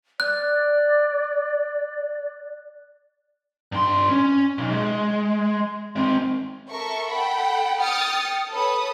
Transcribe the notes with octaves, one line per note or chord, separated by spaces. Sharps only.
D5 F#6
G2 C6
C#4
B1
G#3
G#3 C4
A4 A#4 E5 C#6
A4 F#5 G5 B5
G5 D#6 F6 A6 C#7
A4 B4 C#5 D#6